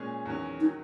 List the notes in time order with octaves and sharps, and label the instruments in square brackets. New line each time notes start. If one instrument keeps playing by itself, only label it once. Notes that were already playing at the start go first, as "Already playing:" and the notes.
Already playing: [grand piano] A#2 G#3 C#4 G#4
E2 D#3 F#3 C#4
[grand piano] D#3 F#3 [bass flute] D#4